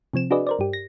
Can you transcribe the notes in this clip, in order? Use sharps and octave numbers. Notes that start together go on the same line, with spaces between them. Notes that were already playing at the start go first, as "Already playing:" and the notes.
C3 F3 C4 E7
D4 F#4 G#4 B4 D5 D#5
A#4 C5 D5
G2 G4
A#6